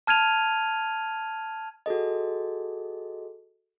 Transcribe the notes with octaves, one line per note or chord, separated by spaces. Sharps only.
A5 F6 G#6 D#7 F7
F#4 G#4 A4 D#5